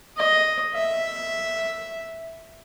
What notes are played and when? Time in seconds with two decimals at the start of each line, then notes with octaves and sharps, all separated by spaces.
0.17 D#5
0.74 E5